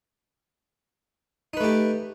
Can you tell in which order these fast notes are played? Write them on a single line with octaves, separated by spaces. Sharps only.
D#4 B4 A3 G4